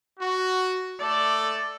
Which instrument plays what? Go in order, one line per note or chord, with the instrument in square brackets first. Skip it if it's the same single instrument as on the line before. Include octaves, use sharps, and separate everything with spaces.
[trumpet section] F#4
[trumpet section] A3 A4 [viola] D5